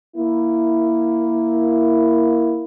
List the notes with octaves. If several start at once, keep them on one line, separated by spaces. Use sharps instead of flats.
A#3 E4